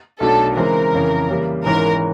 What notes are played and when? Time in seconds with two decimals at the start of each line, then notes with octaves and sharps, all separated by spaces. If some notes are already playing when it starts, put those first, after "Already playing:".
0.20 B1 B2 F#3 A3 D4 A4
0.56 C#3 E3 G#3 C4 A#4
0.93 F2 C#3 E3
1.29 C#3 E3 G3 A#3
1.65 G#1 G#2 E3 G#3 C#4 A#4